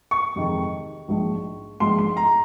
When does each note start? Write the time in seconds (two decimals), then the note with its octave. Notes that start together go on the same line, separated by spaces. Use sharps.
0.11 C#6
0.36 F2 C3 D#3 G#3
1.08 A#1 G#2 F3
1.80 A#1 G#2 F3 C6
1.99 C6
2.17 A#5